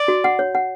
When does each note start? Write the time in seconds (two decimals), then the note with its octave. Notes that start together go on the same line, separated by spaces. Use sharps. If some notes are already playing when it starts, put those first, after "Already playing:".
Already playing: D5
0.08 F#4
0.24 F#5
0.39 C#5
0.55 F#5